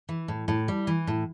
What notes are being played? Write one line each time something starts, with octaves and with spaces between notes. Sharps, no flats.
E3
A2
A2
G3
E3
A2